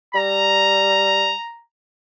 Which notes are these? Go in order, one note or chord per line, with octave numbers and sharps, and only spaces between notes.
G3 A#5